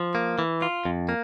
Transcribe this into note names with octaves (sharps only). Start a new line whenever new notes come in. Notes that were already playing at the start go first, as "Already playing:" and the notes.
Already playing: F3
A#3
E3
F4
F2
A#3